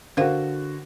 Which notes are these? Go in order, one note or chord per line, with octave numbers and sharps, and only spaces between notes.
D3 F#4 A#4 C5 F5